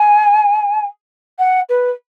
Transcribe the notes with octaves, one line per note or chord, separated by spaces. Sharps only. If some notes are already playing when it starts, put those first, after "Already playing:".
Already playing: G#5
F#5
B4